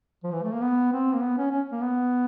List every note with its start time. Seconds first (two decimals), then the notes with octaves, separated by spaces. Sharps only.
0.23 F3
0.32 E3
0.44 A3
0.53 A#3
0.62 B3
0.93 C4
1.15 A#3
1.22 B3
1.38 C#4
1.52 C#4
1.72 A#3
1.82 B3